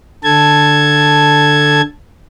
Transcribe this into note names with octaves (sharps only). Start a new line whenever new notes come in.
D3 A4 A5 G#6